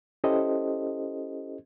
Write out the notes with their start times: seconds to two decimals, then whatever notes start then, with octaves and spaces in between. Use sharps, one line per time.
0.24 C#4 E4 G4 A4 C5 D#5